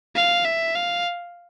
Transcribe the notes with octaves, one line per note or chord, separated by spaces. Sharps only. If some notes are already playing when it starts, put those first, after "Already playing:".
F5
E5
F5